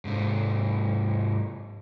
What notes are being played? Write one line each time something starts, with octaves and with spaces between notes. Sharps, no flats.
G#2 C3